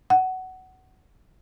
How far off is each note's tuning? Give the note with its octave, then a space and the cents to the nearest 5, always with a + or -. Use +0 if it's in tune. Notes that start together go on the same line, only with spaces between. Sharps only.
F#5 +15